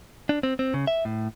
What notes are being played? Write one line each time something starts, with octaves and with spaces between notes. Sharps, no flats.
D4
C4
C4
C#3
E5
A2